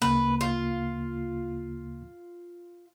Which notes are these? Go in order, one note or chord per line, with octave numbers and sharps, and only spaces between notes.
D2 C#3 A#3 B4
F4